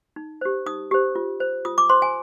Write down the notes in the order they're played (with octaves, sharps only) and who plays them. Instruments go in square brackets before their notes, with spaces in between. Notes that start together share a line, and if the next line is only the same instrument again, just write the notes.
[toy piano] D#4
G4 C5
D#4 D#6
G4 C5
F4
C5
F4 D#6
D6
C5 C6
G#5